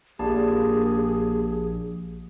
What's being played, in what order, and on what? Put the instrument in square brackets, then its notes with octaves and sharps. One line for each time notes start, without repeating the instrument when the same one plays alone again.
[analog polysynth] A#1 [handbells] A#3 G4 A5 [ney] G#4